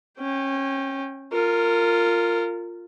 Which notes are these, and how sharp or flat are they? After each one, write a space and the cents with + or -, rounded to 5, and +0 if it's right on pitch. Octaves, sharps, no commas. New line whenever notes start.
C#4 -25 G5 +0
F4 +0 A#4 -25